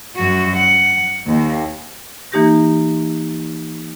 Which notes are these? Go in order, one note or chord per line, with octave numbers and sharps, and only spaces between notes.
F#2 F#4
F#5
D#2
E3 A#3 D#4 G4 G6 A#6